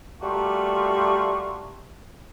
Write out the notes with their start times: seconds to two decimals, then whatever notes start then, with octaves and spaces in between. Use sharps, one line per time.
0.22 G3 A3 A#3 F4 F#4